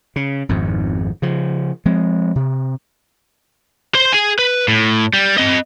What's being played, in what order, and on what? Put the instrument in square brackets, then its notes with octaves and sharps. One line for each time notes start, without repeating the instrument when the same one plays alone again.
[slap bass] C#3
G#1 F2 G#2
C#3 F3
F3 G#3 C4
C3
[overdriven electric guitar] C5 C6
G#4 G#5
B4
A2
G3
C4 D#5